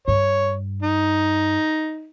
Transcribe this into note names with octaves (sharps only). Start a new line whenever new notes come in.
G2 C#5
D#4